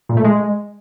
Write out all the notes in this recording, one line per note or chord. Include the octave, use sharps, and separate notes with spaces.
A#2
A3
G#3